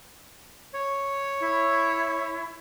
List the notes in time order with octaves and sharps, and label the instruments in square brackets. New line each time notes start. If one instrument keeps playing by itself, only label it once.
[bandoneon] C#5
[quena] E4